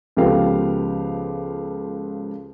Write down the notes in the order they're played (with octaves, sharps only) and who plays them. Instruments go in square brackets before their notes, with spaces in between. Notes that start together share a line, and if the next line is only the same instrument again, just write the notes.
[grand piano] C#2 F3 B3 G4 A4 F5